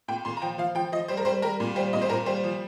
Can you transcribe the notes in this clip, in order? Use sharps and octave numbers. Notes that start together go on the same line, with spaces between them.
A#2 G5
A#2 C6
A#5
F3 G5
F3 F5
F3 G5
F3 D#5
G3 C5
A#4
G3 C5
G3 A#4
A#2
G3 C5
A#2 D#5
C5
A#2 A#4
G3 C5
F3